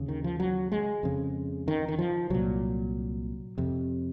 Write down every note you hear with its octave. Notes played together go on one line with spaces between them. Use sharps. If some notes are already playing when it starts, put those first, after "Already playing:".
Already playing: D#2 C#3
D#3
F3
F#3
G#3
F2 C#3
D#3
D#3
F3
C2 A#2 F#3
F2 C3